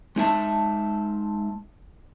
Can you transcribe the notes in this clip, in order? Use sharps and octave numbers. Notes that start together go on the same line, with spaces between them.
G#3 D#4 E5 A5